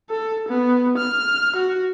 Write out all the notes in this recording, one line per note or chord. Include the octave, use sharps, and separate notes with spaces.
A4
B3
F6
F#4